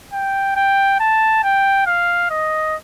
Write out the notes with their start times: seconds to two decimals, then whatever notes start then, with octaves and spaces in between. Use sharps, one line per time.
0.13 G5
0.56 G5
1.00 A5
1.43 G5
1.86 F5
2.30 D#5